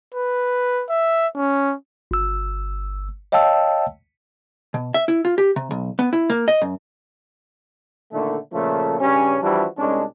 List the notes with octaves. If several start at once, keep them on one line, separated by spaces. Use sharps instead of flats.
B4
E5
C#4
G1 E6
C#5 D#5 F5 G5 A5 E6
B2
E5
E4
F4
G4
C3
B1
B3
E4
A#3
D#5
F#2
A#2 D3 D#3 A3
A#2 C#3 F3 A3
G2 C#3 G3 C#4
E3 F3 G3 D4 E4 F#4
C2 G#3 C#4 D4